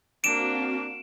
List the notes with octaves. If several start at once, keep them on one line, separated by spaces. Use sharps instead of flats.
A#3 C4 D4 F#4 F5 D7 E7